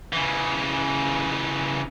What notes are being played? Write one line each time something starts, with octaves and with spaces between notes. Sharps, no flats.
C#3 E3